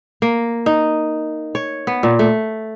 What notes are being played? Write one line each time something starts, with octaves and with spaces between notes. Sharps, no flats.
A#3
D#4
C#5
B3
A#2
A3